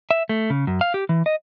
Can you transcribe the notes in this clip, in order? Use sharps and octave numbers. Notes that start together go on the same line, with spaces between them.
E5
A3
C#3
F#2
F5
G4
E3
D#5